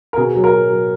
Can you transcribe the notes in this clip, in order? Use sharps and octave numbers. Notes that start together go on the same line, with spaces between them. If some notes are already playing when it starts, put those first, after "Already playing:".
A#4
B2 G#4
F#3
A#4
F#3
F#3